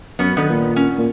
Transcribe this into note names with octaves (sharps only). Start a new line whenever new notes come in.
F#2 B3 C#4
D3 D#3 B3 B4
A#2
C#4
A#2